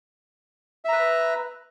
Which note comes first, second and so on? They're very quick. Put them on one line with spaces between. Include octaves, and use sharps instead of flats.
E5 A#5 B4